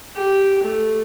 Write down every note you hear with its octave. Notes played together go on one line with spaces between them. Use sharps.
G4
A3